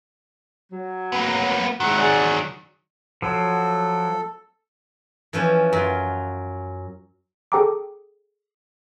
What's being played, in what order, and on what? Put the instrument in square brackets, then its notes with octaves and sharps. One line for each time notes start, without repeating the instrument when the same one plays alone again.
[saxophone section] F#3
[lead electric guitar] A#3 B3
[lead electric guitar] D#3 F#3 [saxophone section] G#3 E4 F#5
[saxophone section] G#4 D5 F#5
[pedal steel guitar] F3 F#3 [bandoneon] A4
[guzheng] E3 F3 C#4
F#2 F4
[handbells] G#4 A4 G5 A#5 D6